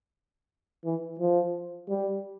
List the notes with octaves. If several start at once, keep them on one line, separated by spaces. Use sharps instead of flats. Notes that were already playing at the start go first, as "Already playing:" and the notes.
E3
F3
G3